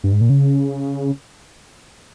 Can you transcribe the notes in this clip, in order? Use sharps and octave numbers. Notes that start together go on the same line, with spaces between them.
G2
G#2
A#2
C#3